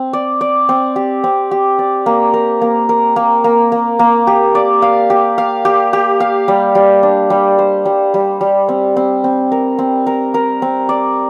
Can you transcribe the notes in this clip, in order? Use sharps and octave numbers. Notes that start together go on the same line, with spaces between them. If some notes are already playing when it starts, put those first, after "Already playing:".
Already playing: C4
D5
D5
C4
G4
C4
G4
D5
A#3
A#4
A#3
A#4
A#3
A#3
A#3
A#3
G4
D5
F5
G4
F5
G4
G4
F5
G3
G3
D4
G3
C5
G3
G3
G3
C4
C4
C4
A#4
C4
A#4
A#4
C4
D5